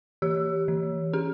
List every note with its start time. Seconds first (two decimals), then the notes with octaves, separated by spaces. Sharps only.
0.22 E3 G4
0.68 E3
1.13 C#4 G#4